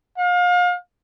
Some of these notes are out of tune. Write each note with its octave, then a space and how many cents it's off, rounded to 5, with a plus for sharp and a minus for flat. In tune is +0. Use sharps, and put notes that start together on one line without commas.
F5 +35